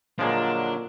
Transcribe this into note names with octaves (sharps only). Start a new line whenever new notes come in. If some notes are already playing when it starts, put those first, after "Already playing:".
A#2 D3 F3 F#3 G#3 A#3 D4